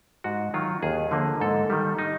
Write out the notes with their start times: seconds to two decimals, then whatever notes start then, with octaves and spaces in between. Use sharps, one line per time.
0.24 G#2 F#4
0.54 D#3 F#3 F4
0.83 D#2 G#4
1.11 D3 F3 A#3
1.40 G#2 A4
1.70 D#3 G3
1.99 D#4